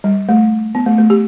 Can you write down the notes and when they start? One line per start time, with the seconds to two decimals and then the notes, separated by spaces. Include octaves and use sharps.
0.04 G3
0.29 A3
0.75 B3
0.86 A3
0.98 A3
1.10 G4